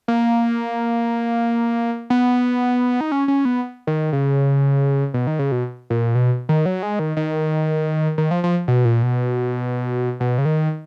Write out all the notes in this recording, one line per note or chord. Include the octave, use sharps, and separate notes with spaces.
A#3
B3
D#4
C#4
C#4
B3
D#3
C#3
B2
D#3
C#3
B2
A#2
B2
D#3
F#3
G#3
D#3
D#3
D#3
F3
F3
B2
A#2
B2
B2
C#3
D#3